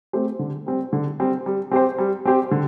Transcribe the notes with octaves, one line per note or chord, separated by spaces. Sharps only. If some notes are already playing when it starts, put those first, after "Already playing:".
A3 C4 G4 C5
D3
G3 C4
D3
G3 C4
G3
C4 G4 C5
G3
C4 G4 C5
D3